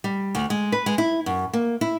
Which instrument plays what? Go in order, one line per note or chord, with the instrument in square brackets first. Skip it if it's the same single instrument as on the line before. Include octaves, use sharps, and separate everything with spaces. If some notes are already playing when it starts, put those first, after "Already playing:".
[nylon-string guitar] G3
D2
G#3
B4
G#3
E4
F#2
A#3
E4